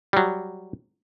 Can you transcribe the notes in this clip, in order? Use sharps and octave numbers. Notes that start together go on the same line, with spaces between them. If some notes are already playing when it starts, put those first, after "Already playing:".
F#3 G3